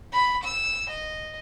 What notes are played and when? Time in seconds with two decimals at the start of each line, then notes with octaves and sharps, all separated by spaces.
0.13 B5
0.44 E6
0.91 D#5